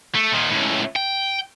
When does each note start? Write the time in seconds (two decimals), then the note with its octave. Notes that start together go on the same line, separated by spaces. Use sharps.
0.15 A3
0.32 A#2 D#3
0.50 C#2 A2
0.96 G5